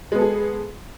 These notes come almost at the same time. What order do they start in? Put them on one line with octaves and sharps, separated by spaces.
G#3 B3 A4 G#4